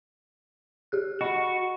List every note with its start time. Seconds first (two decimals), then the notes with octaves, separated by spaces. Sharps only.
0.92 G4 G#4 F#6
1.21 F#4 D#5 F#5 B5